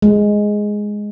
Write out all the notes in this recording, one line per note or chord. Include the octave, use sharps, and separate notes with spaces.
G#3